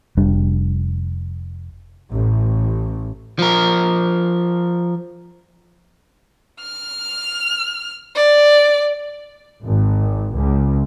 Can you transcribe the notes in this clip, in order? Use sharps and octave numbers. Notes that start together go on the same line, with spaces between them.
F1 G3 D4
A1
F3 A#4
F6
D5
G#1
C#2